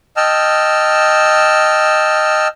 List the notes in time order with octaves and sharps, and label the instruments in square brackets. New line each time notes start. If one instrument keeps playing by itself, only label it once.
[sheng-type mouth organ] D#5 G5 A5 E6 F6